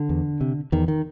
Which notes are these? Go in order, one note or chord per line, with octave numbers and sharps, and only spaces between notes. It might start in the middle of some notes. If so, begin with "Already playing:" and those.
Already playing: D3
E2
C3
E2 D#3
D#3